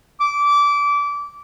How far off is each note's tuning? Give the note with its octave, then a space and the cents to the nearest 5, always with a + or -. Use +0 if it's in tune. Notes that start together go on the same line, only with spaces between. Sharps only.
D6 -20